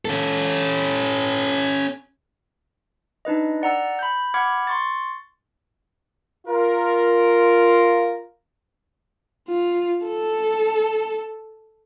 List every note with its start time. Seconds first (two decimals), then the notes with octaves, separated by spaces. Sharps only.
0.05 C#4 A4
3.25 D4 D#4 B4 D#5
3.62 D5 F#5 A#5 E6
3.99 B5 G6
4.34 F#5 B5 D6 F6 G#6
4.67 C6 C#6 A6
6.47 F4 A#4
9.48 F4
10.07 A4